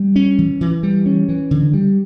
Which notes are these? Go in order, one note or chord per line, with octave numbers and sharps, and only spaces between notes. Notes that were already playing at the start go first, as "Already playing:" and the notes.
Already playing: G3
C#4
E3
E3
G3
C#4
E3
D3
G3